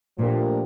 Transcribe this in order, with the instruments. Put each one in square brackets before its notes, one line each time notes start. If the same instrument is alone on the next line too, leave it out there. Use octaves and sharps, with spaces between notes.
[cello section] A#2 [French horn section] F3 A3 D4 G4 A#4